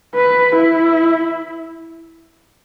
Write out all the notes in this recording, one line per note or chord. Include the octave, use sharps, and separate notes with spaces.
B4
E4